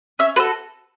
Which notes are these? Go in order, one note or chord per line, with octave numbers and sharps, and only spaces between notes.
C#4 E5
F#4 A4 B4